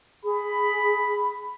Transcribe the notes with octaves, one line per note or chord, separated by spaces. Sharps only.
G#4 B5